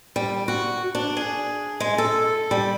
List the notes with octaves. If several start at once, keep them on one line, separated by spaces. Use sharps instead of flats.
G3
F#4
D4
G#4
G#3
A4
G3